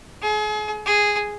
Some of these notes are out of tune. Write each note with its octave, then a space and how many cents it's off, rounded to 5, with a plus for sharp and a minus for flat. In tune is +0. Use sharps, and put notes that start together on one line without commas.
G#4 +35
G#4 -5